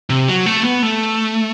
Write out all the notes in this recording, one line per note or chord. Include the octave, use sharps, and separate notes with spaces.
C3
F#3
A3
B3
A3